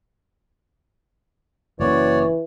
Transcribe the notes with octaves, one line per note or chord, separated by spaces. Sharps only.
F#1 E3 A#3 C#4 F#4 C#5 D5